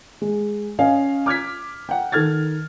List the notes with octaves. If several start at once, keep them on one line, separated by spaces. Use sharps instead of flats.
G#3
C#4 D#5 F5 G#5
D6 F6 G#6 B6
F#5 G5
D#3 A4 F6 G#6 A6